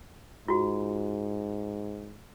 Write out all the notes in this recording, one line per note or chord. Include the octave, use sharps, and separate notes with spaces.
G#2 F4 F#4